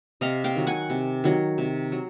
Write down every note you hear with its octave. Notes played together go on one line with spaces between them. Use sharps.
C3 D#5 F5
F5 G5
D#3 F#3
F#5 G#5
C3
D#3 F#3
C3
F#3